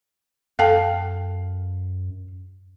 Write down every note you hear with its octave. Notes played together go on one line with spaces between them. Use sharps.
F#2 A4 F5 G5 A5